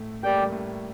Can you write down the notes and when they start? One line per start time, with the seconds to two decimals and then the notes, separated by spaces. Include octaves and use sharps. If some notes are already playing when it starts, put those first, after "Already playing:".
Already playing: A2 A3
0.23 A#3 G4 D5 G5
0.33 A3
0.43 G3
0.52 A2 A3